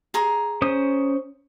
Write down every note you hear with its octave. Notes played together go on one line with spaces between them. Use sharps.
G#4 A#5 C6
C#4 C5 D#6